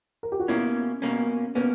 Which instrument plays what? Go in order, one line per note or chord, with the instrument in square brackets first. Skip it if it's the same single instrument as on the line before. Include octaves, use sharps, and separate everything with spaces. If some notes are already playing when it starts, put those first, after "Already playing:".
[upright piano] A#4
G4
F#4
[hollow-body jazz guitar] B2 A#3 C#4 [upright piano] E4
[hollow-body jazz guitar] B2 A#3 C#4
[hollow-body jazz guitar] B2 A#3 C#4 [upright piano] B3